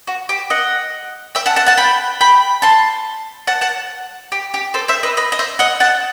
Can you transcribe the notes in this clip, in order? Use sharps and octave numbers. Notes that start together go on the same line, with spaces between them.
F#4
G4
D#5 F#5
E5 G5
F#5 A5
F#5 A5
F#5 A5
G5 B5
G5 B5
A5 C6
F#5 A5
F#5 A5
G4
G4
A4 C5
C5 E5
B4 D#5
B4 D#5
D#5
C5 E5
D#5 F#5
F#5 A5